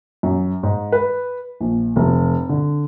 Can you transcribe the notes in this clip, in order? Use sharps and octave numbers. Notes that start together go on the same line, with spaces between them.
F#2
G#2
B4
A#1
F1
D3